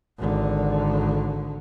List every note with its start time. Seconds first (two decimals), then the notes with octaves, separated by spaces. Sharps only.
0.19 G#1 D3